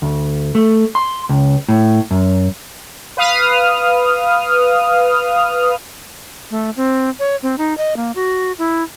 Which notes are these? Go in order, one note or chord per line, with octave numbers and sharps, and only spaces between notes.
D2
A3
C6
C#2
A2
F#2
B4 F5 D#6 F6
A3
C4
C#5
C4
D#4
D#5
A#3
F#4
E4